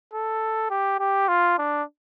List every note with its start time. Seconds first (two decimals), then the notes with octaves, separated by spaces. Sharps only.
0.13 A4
0.70 G4
0.99 G4
1.28 F4
1.58 D4